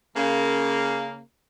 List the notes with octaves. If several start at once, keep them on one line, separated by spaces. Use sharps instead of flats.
C#3 A#3